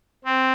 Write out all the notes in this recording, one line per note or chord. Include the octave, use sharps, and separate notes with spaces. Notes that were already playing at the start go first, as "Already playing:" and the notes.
C4